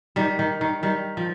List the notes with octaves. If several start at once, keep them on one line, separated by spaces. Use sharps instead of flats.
D#3 G3
D#3
D#3
D#3 G3
F3